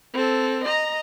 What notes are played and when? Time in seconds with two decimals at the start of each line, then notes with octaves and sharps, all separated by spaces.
0.14 C4 A4
0.64 D#5 A#5